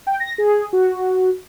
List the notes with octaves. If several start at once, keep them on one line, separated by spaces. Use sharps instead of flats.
G5
A#6
G#4
F#4